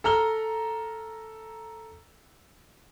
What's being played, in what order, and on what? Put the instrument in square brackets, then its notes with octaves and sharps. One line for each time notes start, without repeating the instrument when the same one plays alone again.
[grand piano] A4 A#5 F6 G7